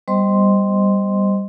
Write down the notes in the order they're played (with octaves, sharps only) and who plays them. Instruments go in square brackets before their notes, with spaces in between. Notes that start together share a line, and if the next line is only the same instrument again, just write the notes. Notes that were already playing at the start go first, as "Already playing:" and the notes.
[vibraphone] G3 B3 C5 D#5 C6